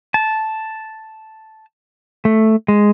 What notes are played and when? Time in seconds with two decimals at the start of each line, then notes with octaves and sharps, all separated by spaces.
0.14 A5
2.25 A3
2.68 G#3